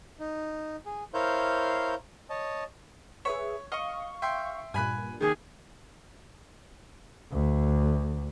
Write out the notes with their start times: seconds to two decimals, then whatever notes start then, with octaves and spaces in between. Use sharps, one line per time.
0.20 D#4
0.86 G#4
1.14 E4 A#4 C5 C#5 F5 G6
2.30 C#5 D#5 A5
3.25 G#4 B4 C#5 E5
3.72 D#5 F5 C#6
4.22 E5 G5 C6
4.74 G2 A#2 G#5 B5 F#6
5.20 D#2 D#3 G#4
7.32 D2